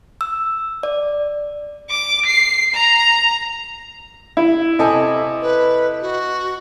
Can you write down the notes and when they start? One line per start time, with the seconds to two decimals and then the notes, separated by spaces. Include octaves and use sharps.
0.21 E6
0.83 D5
1.90 D6
2.26 C7
2.74 A#5
4.37 E4
4.79 C3 A4 D#5 G#5
5.42 B4
6.02 F#4